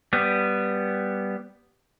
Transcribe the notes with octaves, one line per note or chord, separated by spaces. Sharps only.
G3 B3